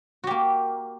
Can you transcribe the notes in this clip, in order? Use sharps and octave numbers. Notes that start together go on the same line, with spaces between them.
A#3 F#4 G4